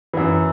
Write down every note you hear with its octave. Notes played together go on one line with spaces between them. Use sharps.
F#2 E3